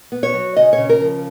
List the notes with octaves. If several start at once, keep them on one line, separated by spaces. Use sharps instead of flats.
B3
C#5
F#3
C#3 D#5
C#3 C#5
A#4
F3